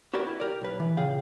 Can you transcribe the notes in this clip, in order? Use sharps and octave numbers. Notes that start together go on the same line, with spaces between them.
F#4 G4 A#4 B4 D5
E4
G4 A#4 D5
B1 B4
E3
A#2 C#3 G#4 F5 G5